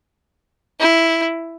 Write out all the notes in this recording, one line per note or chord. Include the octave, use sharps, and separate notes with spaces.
E4